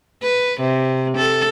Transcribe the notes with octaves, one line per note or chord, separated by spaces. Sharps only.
B4
C3
A4